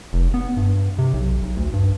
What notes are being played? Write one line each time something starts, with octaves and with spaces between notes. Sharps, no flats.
F1
B3
G2
C3
B1
B1
D2
G2